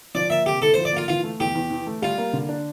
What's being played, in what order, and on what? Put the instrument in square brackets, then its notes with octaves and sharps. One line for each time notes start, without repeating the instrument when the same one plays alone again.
[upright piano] F3 [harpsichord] D5
[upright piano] A#3 [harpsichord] E5
[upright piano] C3 [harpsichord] G4
[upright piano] E4 [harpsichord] A4
[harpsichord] C5
[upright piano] F3
[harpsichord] D5
[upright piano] A#3 [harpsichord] F4
[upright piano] E3 [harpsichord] F4
[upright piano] A3
[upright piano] E2 [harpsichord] G4
[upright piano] E2
E3
A3
[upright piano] G3 [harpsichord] F4
[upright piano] A#3
D3
D4